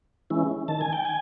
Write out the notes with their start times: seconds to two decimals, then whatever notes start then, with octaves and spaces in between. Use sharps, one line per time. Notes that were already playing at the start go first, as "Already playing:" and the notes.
0.30 E3 G#3 C#4 E4
0.68 D#3 A5
0.81 G#5
0.93 G5
1.05 G#5